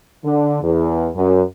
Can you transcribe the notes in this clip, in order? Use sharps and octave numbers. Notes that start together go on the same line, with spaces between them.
D3
E2
F#2